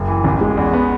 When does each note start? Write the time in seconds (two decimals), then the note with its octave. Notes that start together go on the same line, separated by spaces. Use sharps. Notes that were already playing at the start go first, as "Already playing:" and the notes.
Already playing: F#1
0.08 E3
0.24 A1
0.41 G#3
0.57 E2
0.73 B3